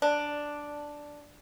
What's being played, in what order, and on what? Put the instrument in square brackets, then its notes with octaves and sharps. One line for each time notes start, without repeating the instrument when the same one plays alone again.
[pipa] D4